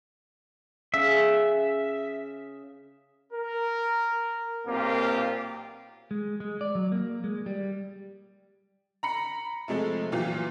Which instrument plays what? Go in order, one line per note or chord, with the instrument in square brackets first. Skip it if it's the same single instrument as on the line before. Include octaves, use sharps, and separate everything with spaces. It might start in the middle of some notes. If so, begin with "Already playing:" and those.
[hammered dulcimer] C#3 [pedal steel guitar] E5
[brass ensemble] A#4
B1 A#2 A#3 C4 F4 G4
[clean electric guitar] G#3
G#3
D5
F#3
A#3
G#3
G3
[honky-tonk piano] A#5 B5 C#7
C3 F3 G#3 A3
A#2 E3 F#3 F4 G4